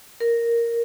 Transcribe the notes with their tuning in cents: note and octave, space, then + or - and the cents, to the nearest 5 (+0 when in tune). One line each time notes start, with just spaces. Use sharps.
A#4 +0